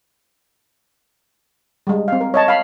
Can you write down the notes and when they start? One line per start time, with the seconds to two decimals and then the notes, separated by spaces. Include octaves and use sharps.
1.87 G3 G#3
2.08 C4 F5
2.21 A#4
2.34 C#5 D#5 A5
2.48 F5 B5